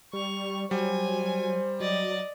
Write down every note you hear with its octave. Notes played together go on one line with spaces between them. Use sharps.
G3 C#6 F7
F#3 G3 C5 G#5
F#3 D5 D#5